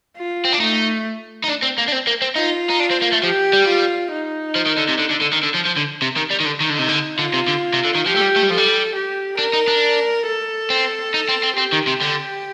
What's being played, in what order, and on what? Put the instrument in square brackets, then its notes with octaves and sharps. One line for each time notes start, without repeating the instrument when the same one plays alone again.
[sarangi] F4
[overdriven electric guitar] C4
D4
[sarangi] A3 [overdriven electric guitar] D#4
[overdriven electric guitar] D#4
D4
C4
A#3
D4
C4
A#3
C4
[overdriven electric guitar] D#4 [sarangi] F4
[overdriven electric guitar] D#4
D4
C4
A#3
A3
[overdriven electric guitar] F3 [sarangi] G4
[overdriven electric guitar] G3
[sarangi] F4
D#4
[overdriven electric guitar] F3
D#3
D3
C3
D3
D3
D3
D#3
D3
F3
F3
D3
C3
D#3
G3
D#3
D3
D#3
D3
[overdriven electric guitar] C3 [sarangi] D#4
[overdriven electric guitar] D3
[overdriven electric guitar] D3 [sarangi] F4
[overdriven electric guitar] C3
D3
C3
D3
D#3
[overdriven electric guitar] F3 [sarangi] G4
[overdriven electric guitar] A3
G3
A3
G3
[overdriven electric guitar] F3 [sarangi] A4
[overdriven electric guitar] G3
[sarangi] G4
[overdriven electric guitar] D4 [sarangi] A#4
[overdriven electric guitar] D#4
D4
[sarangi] A4
[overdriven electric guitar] C4
D#4
C4
C4
[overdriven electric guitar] C4 [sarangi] G4
[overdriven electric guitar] D#3
C3
D3